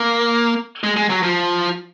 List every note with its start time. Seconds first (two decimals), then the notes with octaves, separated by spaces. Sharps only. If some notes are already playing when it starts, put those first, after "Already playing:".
Already playing: A#3
0.84 G#3
0.96 G#3
1.10 F#3
1.23 F3